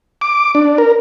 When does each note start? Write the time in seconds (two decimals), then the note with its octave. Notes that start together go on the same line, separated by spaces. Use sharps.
0.21 D6
0.55 D4
0.78 A#4